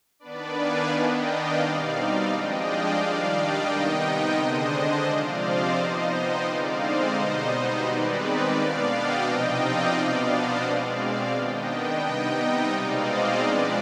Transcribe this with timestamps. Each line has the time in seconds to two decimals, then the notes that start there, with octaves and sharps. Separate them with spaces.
0.19 D#3 B3 D4 B4 D5
0.55 F5 G#5
0.89 D#3 B3 D4 D#5 G5
1.24 D5 F5
1.59 B2 G3 C4 D#4 D5 F5
1.94 D5 F5
2.28 F3 G#3 D4 D#5 G5
2.63 D5 F5
2.98 D#3 G3 D4
3.33 D#5 G5
3.67 C3 D#3 B3 D#4 D#5 G5
4.02 D#5 G5
4.36 D3 G#3 D4 C5 D#5
4.72 C5 D#5
5.06 C3 F3 C4 D5 F5
5.40 C5 D#5
5.75 F3 B3 D#4 C5 D#5
6.10 D#5 G5
6.45 D3 G#3 C4 D#4 D5 F5
6.80 C5 D#5
7.15 B2 G3 B3 D#4
7.84 D#3 G#3 C4 D#4 B4 D5
8.53 B2 B3 D4 D5 F5
8.88 D#5 G5
9.23 C3 F3 C4 D#4 D#5 G5
9.57 D5 F5
9.92 B2 B3 D4 D5 F5
10.28 C5 D#5
10.62 B2 G#3 C4 D5 F5
10.97 D5 F5
11.31 D#3 B3 D4 D#5 G5
11.66 D#5 G5
12.00 C3 G3 B3 D#4 D#5 G5
12.70 B2 G#3 C4 D#4 D5 F5
13.05 C5 D#5
13.39 F3 G#3 D4 B4 D5